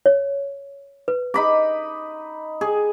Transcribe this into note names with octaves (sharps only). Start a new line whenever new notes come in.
C#5
B4
D#4 B5 D6
G#4